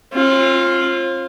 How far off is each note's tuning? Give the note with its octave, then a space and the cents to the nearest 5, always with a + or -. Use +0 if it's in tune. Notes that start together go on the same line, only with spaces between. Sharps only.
C4 +45 F4 +0